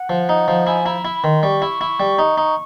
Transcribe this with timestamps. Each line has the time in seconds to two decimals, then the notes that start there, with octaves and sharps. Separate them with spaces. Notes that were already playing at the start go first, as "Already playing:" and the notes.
Already playing: F#5
0.09 F3
0.29 D#4
0.48 F3
0.67 E4 G#5
0.86 E4 A#5
1.05 E4 B5
1.23 D#3 C6
1.43 G3 C#6
1.62 E4
1.81 E4
2.00 G3
2.19 D#4
2.38 D#4